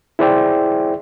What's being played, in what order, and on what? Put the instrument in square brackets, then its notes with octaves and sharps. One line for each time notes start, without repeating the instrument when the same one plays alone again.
[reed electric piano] E4 G#4 C5 D5 E5 G5